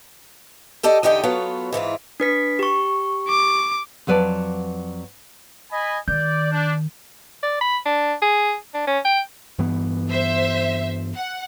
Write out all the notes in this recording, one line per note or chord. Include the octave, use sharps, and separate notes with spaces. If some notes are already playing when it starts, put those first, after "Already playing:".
G4 A4 D5 D#5 G5
E2 D3 D#4 G4 D#5 G5
F#3 B3 F4 A4 C#5
G#2 E3 E4 F4
D4 B4 B6
G4 C#6
D6
F2 F#3 B4 D5 A5
D#5 G#5 B5
D#3 D5 G6
D4
D5
B5
D4
G#4
D4
C#4
G5
G2 E3 B3
C5 E5
F#5